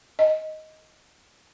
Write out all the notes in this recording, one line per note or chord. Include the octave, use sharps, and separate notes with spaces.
D#5